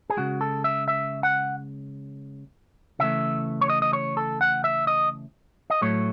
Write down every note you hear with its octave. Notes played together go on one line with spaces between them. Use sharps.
G#4
C#3 G#3 F#4
A4
E5
E5
F#5
C#3 E3 A3 E5
C#5
D#5
D#5
C#5
A4
F#5
E5
D#5
D#5
A2 F#3 A3 C#5